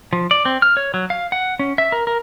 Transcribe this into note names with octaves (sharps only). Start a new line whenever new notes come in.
F3
D5
C4
F6
C#5
F#3
F5
F#5
C#4
E5
A#4
A#4